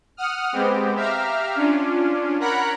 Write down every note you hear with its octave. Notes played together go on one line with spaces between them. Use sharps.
F#5 D#6 F6
G#3 B3 C4 G4
G4 E5 F5 A#5 F6
C#4 D4 F4
A#4 C#5 F#5 A#5 B5 F#6